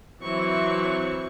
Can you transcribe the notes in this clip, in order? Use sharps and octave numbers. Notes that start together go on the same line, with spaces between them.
E3 F#3 C4 E4 C#6